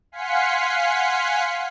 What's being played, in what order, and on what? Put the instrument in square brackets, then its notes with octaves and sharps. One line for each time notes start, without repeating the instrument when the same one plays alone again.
[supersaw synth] F5 F#5 G#5 C6 B6 C#7